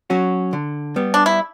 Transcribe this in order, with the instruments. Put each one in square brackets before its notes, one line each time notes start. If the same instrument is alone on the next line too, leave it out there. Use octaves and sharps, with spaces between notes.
[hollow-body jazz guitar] F#3 C#4 F#4
D3
G3 B3
[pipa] D4
E4